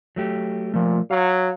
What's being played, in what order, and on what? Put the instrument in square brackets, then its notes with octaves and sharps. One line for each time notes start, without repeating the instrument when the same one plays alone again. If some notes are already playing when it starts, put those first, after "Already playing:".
[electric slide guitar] F#3 A3 G4
[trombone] A#2 [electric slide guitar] F3 A3
[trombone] F#3 [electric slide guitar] F5